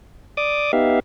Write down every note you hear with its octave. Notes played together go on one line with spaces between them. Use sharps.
D5 D6 D#6
B3 D#4 G4 E5 F5